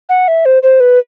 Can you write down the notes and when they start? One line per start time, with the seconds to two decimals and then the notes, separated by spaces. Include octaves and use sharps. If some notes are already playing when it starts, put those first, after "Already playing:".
0.09 F#5
0.28 E5
0.45 C5
0.63 C5
0.80 B4